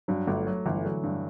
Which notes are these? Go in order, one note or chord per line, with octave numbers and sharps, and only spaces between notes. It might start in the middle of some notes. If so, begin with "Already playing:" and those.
G2 F#3
G1 A3
F#3
G1 E3
D3 F#3
G2